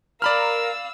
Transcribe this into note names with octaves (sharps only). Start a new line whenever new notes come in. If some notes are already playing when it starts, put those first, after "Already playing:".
A#4 D5 F5 B5 E6 F6